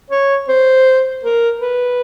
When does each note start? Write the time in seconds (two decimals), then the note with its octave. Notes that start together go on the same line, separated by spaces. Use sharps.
0.10 C#5
0.48 C5
1.23 A#4
1.60 B4